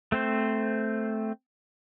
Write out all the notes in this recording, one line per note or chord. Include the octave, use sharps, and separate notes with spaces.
A3 C4 C5